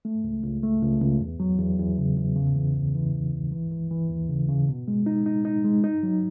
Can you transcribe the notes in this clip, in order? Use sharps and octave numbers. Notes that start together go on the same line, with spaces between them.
A3
C#2
C#2
A3
C#2
C#2
E2
F#3
E2
E2
C#3
E2
C#3
E3
C#2
E3
C#2
C#2
E3
E3
E3
D#2
C#3
C#3
B2
G#3
D#4
D#4
D#4
G#3
D#4
F#3